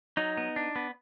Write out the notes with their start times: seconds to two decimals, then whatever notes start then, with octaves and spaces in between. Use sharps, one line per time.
0.17 F#3 D#4
0.37 B3
0.56 D4
0.76 B3